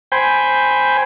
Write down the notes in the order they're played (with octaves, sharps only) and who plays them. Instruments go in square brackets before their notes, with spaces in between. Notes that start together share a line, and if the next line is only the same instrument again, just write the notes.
[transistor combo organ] C5 G5 G#5 B5